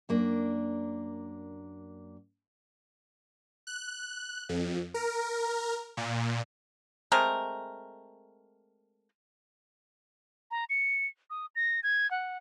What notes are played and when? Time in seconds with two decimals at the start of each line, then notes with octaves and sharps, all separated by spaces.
0.09 F#2 A#3 D4
3.67 F#6
4.49 F2
4.94 A#4
5.97 A#2
7.12 G#3 A3 C4 A#4
10.51 A#5
10.70 C#7
11.30 D#6
11.55 A#6
11.83 G#6
12.11 F#5